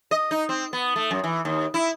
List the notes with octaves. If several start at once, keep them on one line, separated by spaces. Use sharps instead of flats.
D#5
D#4
C4
B3
A3
F#2
E3
D#2
E4